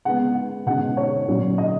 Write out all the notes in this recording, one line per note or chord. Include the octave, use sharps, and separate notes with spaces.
C#3 G#3 B3 F#5
B2 G#3 C#4 F#5
C#5
A#2 F#3 C#4
D#5